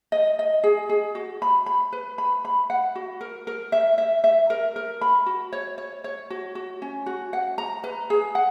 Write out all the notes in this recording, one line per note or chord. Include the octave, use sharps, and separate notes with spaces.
D#5
D#5
G#4
G#4
F#4
B5
B5
B4
B5
B5
F#5
F#4
A#4
A#4
E5
E5
E5
A#4
A#4
B5
F#4
C#5
C#5
C#5
F#4
F#4
C#4
F#4
F#5
A#5
B4
G#4
F#5